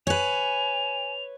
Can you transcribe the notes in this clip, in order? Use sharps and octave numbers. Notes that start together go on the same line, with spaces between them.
B4 C#5 G#5 F7